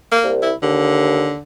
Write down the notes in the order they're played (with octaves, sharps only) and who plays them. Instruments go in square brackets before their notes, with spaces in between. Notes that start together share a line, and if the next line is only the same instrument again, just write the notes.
[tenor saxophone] A#3
[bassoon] C2
[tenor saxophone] E4
[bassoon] D#2 [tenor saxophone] D3